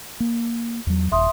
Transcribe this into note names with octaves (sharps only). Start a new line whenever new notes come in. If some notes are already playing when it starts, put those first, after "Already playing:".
A#3
E2 F#3
D#1 E5 C6 D#6